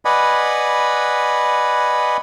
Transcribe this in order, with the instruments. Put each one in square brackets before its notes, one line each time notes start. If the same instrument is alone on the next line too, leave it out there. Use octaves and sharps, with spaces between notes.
[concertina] B4 D5 D#5 F#5 G#5 B5